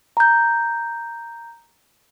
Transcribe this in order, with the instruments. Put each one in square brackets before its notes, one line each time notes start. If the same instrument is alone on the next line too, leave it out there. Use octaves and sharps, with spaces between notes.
[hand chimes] A#5 G6